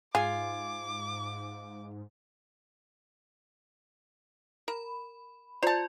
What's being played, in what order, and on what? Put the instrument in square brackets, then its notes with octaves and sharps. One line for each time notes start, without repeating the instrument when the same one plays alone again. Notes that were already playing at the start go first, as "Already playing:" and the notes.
[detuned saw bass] G#2 [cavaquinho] F4 G#5 [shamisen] G#4 [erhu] D6
[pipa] A#4 [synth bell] B5
[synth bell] F4 D5 [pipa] C5 A5